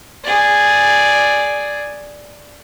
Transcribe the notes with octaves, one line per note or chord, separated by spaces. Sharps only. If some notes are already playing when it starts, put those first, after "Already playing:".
G#4 D5